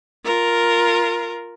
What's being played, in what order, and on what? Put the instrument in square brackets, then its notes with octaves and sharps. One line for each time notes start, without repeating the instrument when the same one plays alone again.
[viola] F4 A#4